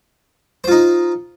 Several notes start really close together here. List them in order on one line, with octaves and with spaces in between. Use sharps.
C5 F4 D#4